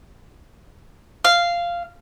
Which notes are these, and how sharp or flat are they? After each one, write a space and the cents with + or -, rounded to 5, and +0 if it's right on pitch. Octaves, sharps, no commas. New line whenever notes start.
F5 -10